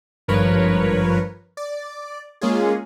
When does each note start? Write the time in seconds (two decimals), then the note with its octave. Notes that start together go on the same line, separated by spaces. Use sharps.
0.28 G#1 G2 F3 A#4 B4 C#5
1.57 D5
2.41 G#3 A#3 C#4 F4 G#4